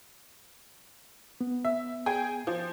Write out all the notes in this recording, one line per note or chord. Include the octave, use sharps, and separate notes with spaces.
B3
E5
G#4 G5 G#5
F3